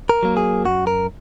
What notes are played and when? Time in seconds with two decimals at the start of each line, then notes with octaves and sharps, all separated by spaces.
0.09 A#4
0.23 F#3 A#3
0.37 G#4
0.65 F#2 F#4
0.87 A#4